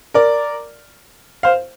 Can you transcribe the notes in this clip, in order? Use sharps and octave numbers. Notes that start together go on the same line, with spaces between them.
A#4 D5
C5 F5